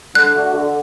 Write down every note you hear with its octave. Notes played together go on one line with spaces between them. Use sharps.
D3 F#6
A3 D4 F#4
D3